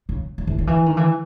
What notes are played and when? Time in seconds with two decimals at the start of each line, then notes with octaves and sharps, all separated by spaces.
0.09 C#3
0.38 F#3
0.47 E3
0.58 D#3
0.67 E3
0.86 D#3
0.97 E3